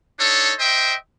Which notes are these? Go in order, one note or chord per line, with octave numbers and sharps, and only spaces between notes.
D4 D#4 A4 C#5
C5 D#5 E5 G5